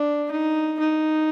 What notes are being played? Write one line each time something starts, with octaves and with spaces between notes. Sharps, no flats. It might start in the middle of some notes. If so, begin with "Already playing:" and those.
Already playing: D4
D#4
D#4